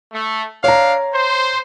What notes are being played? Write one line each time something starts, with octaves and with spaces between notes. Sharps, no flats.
A3
D4 C#5 F5 A#5
C5